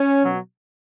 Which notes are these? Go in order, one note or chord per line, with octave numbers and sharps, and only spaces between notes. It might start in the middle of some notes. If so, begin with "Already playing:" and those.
Already playing: C#4
B2 F#3